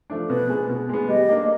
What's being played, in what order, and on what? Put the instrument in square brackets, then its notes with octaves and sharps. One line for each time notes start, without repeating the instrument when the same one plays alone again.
[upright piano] F3 A3 D4
[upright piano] B2 [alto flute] B4
[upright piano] G#3 B3
B2
G#3 B3
[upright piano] G3 [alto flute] D#5
[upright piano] A#3 D4